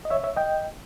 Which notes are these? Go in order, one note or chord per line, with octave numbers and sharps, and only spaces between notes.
D#5
C#5 E5
C#5 E5
D#5 G5